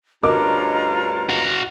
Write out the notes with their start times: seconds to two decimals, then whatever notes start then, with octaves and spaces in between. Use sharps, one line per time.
0.23 D2 G2 C#4 F4 A#4 D#5 A#5 D6
1.30 F#4 F5